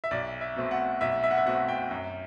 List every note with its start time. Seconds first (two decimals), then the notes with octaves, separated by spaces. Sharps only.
0.04 E5
0.11 B1 D5
0.41 E5
0.56 B2 A3 C4
0.71 F#5
1.01 B1 E5
1.24 E5
1.31 F#5
1.38 E5
1.46 B2 A3 C4 F#5
1.68 G5
1.91 F#2